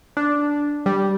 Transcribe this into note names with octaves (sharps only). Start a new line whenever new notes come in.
D4
G3